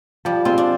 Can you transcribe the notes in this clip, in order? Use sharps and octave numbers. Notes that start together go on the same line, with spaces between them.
F3 G3
G#3 C4 F4
D4